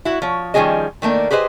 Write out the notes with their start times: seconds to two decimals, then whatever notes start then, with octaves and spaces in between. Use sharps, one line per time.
0.05 E4 F#4
0.22 F3 C#5
0.54 D#3 F3 G3 C#4 G#4 D#5
1.02 D#3 A3 A#3 D4
1.31 G4 G#4 B4 C5 D#5